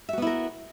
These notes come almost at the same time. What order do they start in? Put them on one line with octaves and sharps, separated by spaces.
E5 F#4 B3 E4 A#4